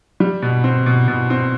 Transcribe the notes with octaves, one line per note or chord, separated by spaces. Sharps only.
G3
B2
C4
B2
B2
C4